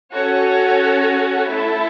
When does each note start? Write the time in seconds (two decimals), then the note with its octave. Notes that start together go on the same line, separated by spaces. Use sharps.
0.13 C#4 F#4 A4 C#5
1.49 A3 E4 A4 E5